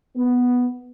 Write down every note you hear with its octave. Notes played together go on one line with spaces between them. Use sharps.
B3